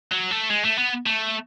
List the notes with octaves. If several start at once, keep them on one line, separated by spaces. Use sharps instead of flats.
F#3
A3
G#3
A3
B3
A3